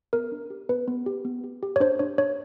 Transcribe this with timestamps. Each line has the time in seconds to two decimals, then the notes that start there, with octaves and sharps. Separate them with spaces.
0.13 B3 A#4
0.32 D4
0.50 G4
0.69 B3 B4
0.88 B3
1.06 G4
1.25 B3
1.44 G4
1.63 G4
1.76 C#5
1.80 D4 C5
1.99 D4 C#5
2.18 D4 C#5